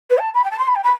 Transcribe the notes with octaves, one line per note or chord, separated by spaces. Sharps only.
B4
A5
B5
G5
A5
C6
B5
G5
B5